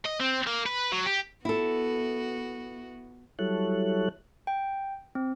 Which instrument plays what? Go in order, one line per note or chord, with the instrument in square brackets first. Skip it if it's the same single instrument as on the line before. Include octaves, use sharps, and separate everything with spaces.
[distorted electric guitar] D#5
C4
A#3
B4
F#3
G4
[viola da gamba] B3 F#4 [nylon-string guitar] E4 A4
[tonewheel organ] F#3 G3 E4 A4 C#5 F#6
[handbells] G5
C4